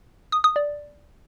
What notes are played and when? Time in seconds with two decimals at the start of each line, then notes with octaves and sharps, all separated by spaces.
0.32 D#6
0.44 D#6
0.56 D5